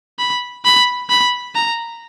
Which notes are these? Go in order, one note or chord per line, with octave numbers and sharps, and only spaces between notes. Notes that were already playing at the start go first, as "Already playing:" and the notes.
B5
B5
B5
A#5